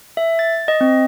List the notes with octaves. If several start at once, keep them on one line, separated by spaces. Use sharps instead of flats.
E5
A6
D#5
C4